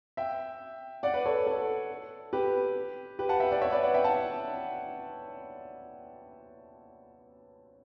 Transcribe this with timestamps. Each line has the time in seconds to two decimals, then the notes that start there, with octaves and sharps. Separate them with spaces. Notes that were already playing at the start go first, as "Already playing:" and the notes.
0.17 E5 G5
1.03 D5 F#5
1.14 B4 D5
1.25 A4 C#5
1.47 A4
2.33 G4 B4
3.19 G4 B4
3.29 F#5 A5
3.40 E5 G5
3.51 D5 F#5
3.61 C#5 E5
3.72 B4 D5
3.83 D5 F#5
3.94 E5 G5
4.04 F#5 A5